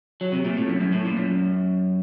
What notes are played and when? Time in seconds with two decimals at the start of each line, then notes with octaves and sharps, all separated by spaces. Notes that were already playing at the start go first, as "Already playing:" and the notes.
0.21 F#3
0.32 C3
0.45 A#2
0.57 A2
0.69 F#2
0.80 F#2
0.92 A2
1.05 A#2
1.17 F#2